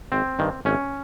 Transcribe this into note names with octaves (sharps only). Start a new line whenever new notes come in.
G#1 C4
G2 D#3
G#1 C#4